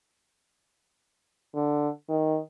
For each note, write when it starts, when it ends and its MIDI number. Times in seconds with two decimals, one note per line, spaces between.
1.55 1.89 50
2.09 2.39 51